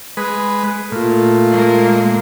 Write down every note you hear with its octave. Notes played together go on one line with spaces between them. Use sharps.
G#3 B4
A#2 A3 F4
G#3 A#3